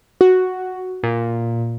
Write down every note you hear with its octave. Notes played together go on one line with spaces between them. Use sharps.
F#4
A#2